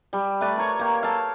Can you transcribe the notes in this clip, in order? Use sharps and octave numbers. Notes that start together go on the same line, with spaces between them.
G3
A3 B4 D5
A#4 C#5
A#3 G4
A4 F5